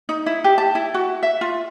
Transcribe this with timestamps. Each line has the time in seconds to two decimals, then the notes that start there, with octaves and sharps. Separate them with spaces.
0.09 D#4
0.26 E4
0.44 G4
0.58 A5
0.75 E4
0.94 F#4
1.23 E5
1.41 F4